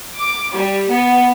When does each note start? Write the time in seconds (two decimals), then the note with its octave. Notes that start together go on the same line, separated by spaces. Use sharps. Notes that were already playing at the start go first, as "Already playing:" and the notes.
0.16 D6
0.52 G3
0.89 B3